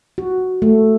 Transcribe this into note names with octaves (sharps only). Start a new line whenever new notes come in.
F#4
A3